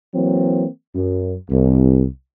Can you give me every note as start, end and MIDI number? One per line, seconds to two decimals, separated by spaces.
0.14 0.66 52
0.14 0.66 54
0.14 0.66 58
0.14 0.66 60
0.95 1.34 42
1.50 2.05 36